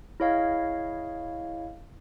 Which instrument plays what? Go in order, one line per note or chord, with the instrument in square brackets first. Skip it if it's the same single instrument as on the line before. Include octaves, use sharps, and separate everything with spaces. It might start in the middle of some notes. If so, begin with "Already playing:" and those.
[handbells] E4 G#4 C#5 D#5 F5